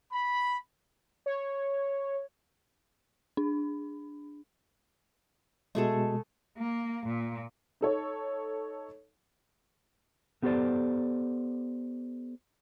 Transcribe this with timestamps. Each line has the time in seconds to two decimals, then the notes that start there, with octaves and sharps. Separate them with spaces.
0.12 B5
1.26 C#5
3.37 D4
5.75 B2 G#3 A3 G#4 A4
6.58 A#3
7.05 A#2
7.81 D#4 A4 C#5
10.43 A3 B3 G4 A4 C5 D5